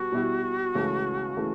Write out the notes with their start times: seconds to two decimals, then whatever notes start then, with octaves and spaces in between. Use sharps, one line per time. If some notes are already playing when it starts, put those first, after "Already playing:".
Already playing: B2 G3 B3 F#4
0.12 B2 G3 B3 E4
0.75 C#2 C#3 E3 A3
1.37 C#3 E3 A3